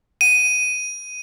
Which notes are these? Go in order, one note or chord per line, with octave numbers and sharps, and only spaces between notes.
D#7